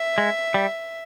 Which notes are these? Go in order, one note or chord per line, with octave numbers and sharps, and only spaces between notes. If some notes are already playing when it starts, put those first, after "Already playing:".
Already playing: E5
G#3
G3